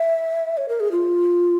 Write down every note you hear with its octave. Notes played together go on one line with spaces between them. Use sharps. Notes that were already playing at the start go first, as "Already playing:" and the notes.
Already playing: E5
C#5
A#4
G#4
F4